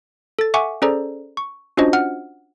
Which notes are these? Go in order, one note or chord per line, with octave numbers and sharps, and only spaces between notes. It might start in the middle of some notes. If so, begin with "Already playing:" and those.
A4 A6
E5 F#5 G#5 C#6 D6
C#4 G#4 A4 C5 D5 A#5
C#6
C#4 D4 F4 F#4 C5 D#5
F#5 F6